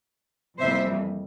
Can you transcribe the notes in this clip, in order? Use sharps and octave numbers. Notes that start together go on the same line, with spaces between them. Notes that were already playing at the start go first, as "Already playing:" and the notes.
F2 C3 E3 G3 A#3 C5 E5